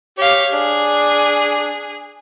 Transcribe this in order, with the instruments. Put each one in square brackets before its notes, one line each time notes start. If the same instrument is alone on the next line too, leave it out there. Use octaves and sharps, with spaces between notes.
[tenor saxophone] G4 [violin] C#5 F5
[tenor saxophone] D4 [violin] G#4